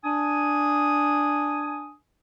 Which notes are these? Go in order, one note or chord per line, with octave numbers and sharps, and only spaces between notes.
D4 G#5 D#6